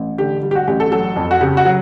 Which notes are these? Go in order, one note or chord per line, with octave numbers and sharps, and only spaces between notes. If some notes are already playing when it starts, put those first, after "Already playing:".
Already playing: A1
D3 G4
G3
G4
F#4
A1 G4
A4
F#3 A4
F2
F#4
C#3 G4
F#4
F#3